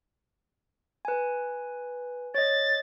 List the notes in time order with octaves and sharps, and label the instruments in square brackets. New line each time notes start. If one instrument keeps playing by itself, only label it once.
[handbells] B4 G#5
[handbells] C#5 D#5 [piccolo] A6